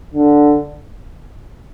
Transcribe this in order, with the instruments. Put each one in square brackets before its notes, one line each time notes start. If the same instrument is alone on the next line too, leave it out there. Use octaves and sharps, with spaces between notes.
[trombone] D3